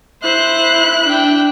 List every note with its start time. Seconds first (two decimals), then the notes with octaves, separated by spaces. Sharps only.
0.23 E4 C5 F#6
1.05 D4 G5